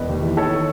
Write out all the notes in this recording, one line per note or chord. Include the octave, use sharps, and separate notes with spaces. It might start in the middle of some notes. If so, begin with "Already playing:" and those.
Already playing: E1 B4 D#5
D#2
E3
D#3 A4 C#5